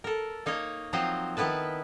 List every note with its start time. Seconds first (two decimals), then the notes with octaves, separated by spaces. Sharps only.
0.04 A4 A#4
0.46 A#3 D#4 C#5 D#5
0.93 F3 F#3 C4 D#4 C5 D#5
1.37 D#3 B3 E4 B4 A5